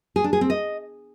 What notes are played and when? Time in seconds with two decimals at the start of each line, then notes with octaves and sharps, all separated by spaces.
0.16 G#4
0.24 D4
0.33 G#4
0.41 C4
0.50 D#5